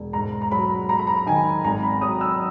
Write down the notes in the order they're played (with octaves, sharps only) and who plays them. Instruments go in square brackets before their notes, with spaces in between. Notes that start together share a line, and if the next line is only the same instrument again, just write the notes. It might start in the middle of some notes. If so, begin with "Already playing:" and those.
Already playing: [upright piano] E1
G#2 A#5
A#5
F#3 B5
F#3 A#5
B5
A#5
D#3 G#5
G#1 A#5
B5
F#3 D#6
E6